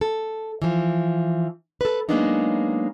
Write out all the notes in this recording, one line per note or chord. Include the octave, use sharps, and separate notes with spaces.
A4
E3 F3
A4 B4
F#3 G#3 A#3 B3 D4 D#4